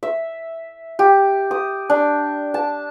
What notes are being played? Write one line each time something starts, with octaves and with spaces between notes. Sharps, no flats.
E5
G4
D#6
D4
A5